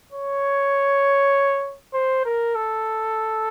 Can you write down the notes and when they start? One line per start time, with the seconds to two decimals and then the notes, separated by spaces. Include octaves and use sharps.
0.12 C#5
1.94 C5
2.25 A#4
2.55 A4